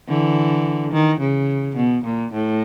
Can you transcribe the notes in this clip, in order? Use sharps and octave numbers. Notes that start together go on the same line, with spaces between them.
D3 E3
D#3
C#3
B2
A#2
A2